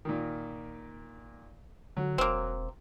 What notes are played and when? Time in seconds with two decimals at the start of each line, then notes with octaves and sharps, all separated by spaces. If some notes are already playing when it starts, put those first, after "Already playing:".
0.05 A#2 D#3
1.97 D3 F#3
2.18 E1 A#3 C4